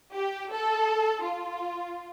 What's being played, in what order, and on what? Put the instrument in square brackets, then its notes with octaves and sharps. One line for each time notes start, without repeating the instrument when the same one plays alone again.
[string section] G4
A4
F4